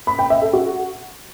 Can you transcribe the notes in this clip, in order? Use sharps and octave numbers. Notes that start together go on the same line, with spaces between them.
B5
G5
E5
A4
F#4